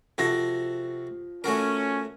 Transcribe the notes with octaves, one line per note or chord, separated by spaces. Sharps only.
C3 F3 F#4 A4 A#6
A3 C#4 F#4 A#4